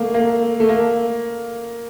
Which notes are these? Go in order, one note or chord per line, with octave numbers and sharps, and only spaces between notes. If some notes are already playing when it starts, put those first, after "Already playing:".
Already playing: A3 A#3
A#3
A3
A#3